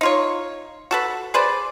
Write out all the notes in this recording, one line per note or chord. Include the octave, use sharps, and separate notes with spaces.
D#4 F4 C#5
F#4 A4 B4
G#4 B4 C5 D5